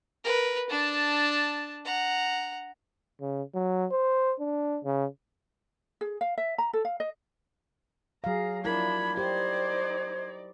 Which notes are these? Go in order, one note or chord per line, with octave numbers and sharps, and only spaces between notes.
A#4 B4
D4 A5
F#5 A#5
C#3
F#3
C5
D4
C#3
G#4
F5
E5
A#5
A4
F5
D#5
F#3 G#4 F5 A#5
F3 D4 E4 A#4 B5 G#6
D#4 G4 C5 D5